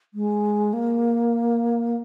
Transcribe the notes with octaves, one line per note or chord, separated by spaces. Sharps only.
G#3
A#3